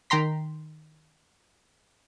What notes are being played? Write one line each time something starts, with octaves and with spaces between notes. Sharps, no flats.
D#3 G5 A#5 C6 B6